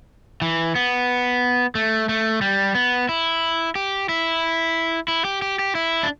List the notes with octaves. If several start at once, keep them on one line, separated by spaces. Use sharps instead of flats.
E3
B3
A3
A3
G3
B3
E4
G4
E4
E4
G4
G4
G4
E4
D4